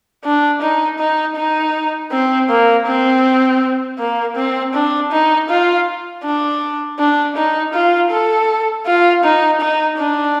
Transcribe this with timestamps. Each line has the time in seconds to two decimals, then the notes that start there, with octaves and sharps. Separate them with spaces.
0.25 D4
0.62 D#4
0.99 D#4
1.36 D#4
2.12 C4
2.50 A#3
2.87 C4
3.99 A#3
4.36 C4
4.74 D4
5.12 D#4
5.49 F4
6.24 D4
6.99 D4
7.36 D#4
7.74 F4
8.11 A4
8.86 F4
9.24 D#4
9.61 D#4
9.98 D4